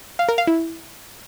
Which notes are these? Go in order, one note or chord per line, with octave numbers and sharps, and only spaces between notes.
F5
A#4
F5
E4